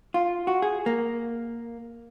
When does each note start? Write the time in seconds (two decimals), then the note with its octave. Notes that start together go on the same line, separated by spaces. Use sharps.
0.14 F4
0.47 F#4
0.62 G#4
0.86 A#3